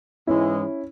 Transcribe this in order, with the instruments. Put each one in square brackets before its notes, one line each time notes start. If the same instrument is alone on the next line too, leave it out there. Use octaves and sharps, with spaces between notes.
[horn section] G#2 E3 G#3 [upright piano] C#4 E4